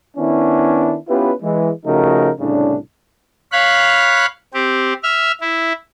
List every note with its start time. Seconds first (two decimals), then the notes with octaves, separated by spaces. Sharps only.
0.17 D#3 B3 C#4 D4 E4
1.08 B3 C#4 E4 F4 G4 B4
1.43 E3 G#3
1.86 C#3 F3 A3 D#4 F#4 A#4
2.40 C2 A2 C#3 D4
3.52 C#5 F5 B5 F#6
4.54 C4 G4
5.03 E5 F6
5.41 E4